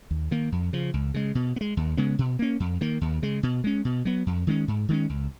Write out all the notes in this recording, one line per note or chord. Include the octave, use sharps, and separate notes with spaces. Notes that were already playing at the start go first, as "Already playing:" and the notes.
D#2
D#3 A#3
F2
C#3 F3
C#2
C#3 G#3
B2
B3
G#3
D#2
C#3 G#3 B3
B2
A#3 C#4
F2
D#3 A#3
D#2
C#3 G#3
B2
G#3 C#4
B2
F#3 B3
F2
D#3 G#3 C#4
G#2
D#3 G#3 C#4
C#2